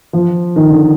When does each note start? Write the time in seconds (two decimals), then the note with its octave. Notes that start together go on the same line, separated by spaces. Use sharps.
0.13 F3
0.56 D#3
0.70 D3